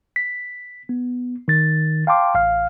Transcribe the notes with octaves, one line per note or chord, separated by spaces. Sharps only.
B6
B3
D#3 A6
F5 G5 A5 C6 D6
A1 F5 F6